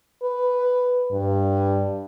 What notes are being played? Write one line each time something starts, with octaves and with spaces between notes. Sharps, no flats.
B4
G2